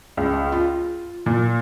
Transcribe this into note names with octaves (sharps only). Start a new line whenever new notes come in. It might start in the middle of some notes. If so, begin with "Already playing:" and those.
C#2
F4
A#2